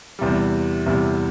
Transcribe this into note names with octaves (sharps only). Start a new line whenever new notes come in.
E2 C3 G3
E2 C3 G3